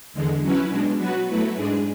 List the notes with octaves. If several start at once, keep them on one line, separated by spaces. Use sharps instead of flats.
E2 D3 G#3
F#3 C#4 E4 B4
B2 G#3 D4
F#3 B3 F#4 B4
F#3 A3 E4 B4
G#2 G#3 D4 G#4